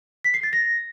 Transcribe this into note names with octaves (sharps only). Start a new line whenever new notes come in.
B6
C7
A6
A#6